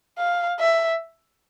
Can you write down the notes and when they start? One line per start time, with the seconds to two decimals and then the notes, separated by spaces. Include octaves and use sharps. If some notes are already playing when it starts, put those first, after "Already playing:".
0.18 F5
0.59 E5